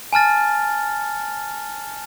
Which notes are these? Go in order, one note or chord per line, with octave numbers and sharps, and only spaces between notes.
G#5 A5 F6 A6